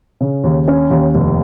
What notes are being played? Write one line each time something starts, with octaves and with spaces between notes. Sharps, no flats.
C#3
D#2
C#4
D#2
F1